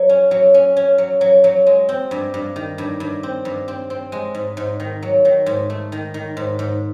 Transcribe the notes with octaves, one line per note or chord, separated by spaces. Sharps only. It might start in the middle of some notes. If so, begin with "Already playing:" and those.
Already playing: F#3
C#4
F#3
C#4
C#4
F#3
F#3
F#3
G#3
C4
G2
G2
D#3
G2
G2
C4
G2
C4
C4
G#3
G#2
G#2
D#3
F#3
D#3
G#2
A3
D#3
D#3
G#2
G#2